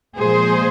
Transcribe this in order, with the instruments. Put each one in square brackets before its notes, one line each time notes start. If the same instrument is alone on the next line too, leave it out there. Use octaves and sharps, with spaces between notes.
[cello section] A#2 F3 G#3 G#4 C5